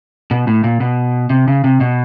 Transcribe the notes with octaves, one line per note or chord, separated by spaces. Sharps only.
B2
A2
A#2
B2
C3
C#3
C3
B2